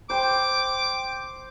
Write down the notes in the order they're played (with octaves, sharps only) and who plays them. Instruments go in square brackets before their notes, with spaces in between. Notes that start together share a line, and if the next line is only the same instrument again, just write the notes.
[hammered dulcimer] C5 G5 [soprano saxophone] D6